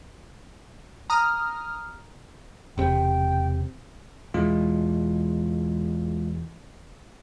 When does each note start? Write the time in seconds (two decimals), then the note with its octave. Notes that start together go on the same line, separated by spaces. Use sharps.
1.10 A#5 D#6 F6
2.78 E1 C3 G5
4.34 E2 B2 E3 G#3 F4